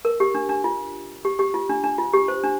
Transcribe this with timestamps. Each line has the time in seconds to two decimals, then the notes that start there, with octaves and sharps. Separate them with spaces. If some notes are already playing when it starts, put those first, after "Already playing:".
0.05 A#4
0.20 G4
0.35 D4
0.49 D4
0.64 F4
1.25 G4
1.39 G4
1.54 F4
1.69 D4
1.84 D4
1.98 F4
2.14 G4
2.28 C5
2.43 D4